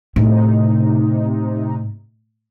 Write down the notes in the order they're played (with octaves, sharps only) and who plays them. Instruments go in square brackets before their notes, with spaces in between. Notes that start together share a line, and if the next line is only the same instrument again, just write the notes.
[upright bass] A2 [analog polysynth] C3 D#4